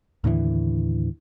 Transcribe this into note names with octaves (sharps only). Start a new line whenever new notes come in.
D#2 A2 D3 E3